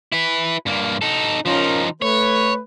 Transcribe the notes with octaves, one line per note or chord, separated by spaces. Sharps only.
E4 B4
G2 A#3
D#4 A4
F3 C#4 D#4 F4 A#4
A3 B4 C#5